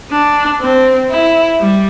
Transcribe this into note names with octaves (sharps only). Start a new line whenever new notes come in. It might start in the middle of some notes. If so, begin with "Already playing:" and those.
D4
C4
E4
G3